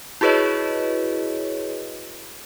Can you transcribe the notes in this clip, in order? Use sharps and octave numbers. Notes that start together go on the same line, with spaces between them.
E4 F#4 G#4 B4 C#5 D#5